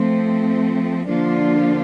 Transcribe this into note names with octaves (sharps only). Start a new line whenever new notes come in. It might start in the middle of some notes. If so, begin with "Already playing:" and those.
Already playing: F3 A3 C4
D3 F3 A#3 D4 F4